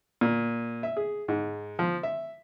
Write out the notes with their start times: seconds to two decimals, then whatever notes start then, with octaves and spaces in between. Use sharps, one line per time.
0.21 A#2
0.83 E5
0.97 G#4
1.28 G#2
1.79 F3
2.03 E5